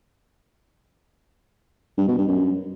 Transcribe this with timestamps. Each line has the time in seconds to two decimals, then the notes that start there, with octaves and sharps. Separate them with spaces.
1.98 G2
2.08 B2
2.18 G2
2.28 F#2